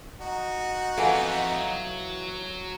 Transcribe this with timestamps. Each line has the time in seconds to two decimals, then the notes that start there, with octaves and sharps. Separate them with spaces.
0.20 D#4 F#4
0.98 F2 E3 B3 F4 A4 F#5 G#5
1.56 F#3